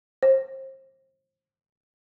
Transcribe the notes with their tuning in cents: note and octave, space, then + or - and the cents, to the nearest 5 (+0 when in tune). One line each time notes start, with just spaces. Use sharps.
C5 +35